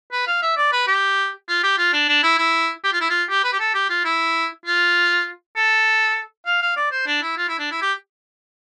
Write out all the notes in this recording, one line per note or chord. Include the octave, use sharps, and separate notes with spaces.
B4
F5
E5
D5
B4
G4
F4
G4
F4
D4
D4
E4
E4
G4
F4
E4
F4
G4
B4
G4
A4
G4
F4
E4
F4
A4
F5
F5
D5
C5
D4
E4
F4
E4
D4
E4
G4